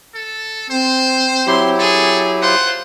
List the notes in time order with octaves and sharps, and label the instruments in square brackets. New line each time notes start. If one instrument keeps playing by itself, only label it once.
[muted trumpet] A4
[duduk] C4 [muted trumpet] C5
[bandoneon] F#3 E4 G4 [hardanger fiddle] C6
[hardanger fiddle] G#4 [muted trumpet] A4
[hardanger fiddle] F4 C5 [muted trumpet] F#5